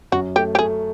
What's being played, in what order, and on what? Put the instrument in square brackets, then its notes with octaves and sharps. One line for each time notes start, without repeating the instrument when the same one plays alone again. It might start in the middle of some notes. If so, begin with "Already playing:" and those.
[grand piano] F#2 [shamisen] F#4
[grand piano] A3 [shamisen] G4
[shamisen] G4
[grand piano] A3 [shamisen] G#4